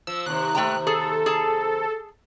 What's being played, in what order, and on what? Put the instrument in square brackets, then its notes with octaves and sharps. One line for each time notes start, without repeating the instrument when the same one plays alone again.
[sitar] F3 [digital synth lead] E6
[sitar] D#2 C3 [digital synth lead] F#6
[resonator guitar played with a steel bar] A3 G5 A#5
[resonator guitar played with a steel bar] G#4 [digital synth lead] A4
[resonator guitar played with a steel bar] G#4 A5